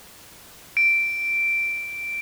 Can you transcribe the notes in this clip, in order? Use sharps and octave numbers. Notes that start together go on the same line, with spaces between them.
D7